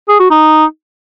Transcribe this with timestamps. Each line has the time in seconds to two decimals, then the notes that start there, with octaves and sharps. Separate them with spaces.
0.09 G#4
0.20 F#4
0.30 D#4